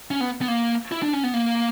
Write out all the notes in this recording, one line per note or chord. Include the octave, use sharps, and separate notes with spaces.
C#4
B3
B3
A#3
E4
D4
C#4
B3
A#3